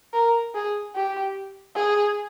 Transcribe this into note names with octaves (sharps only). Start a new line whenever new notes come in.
A#4
G#4
G4
G#4